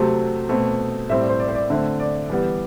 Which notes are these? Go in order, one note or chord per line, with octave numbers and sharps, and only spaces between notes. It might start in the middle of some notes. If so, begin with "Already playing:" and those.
Already playing: C3 F#3 A3 C4
B2 A3 C4
A2 G3 C4 E5
D5
C5
D5
C5
D5
D3 A3 C4 E5
D5
E3 G3 B3